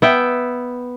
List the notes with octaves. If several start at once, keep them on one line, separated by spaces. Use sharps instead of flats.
B3 E5 G5